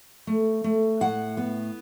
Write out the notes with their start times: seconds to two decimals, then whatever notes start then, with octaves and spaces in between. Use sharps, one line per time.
0.27 A3
0.64 A3
1.01 A2 F#5
1.37 B3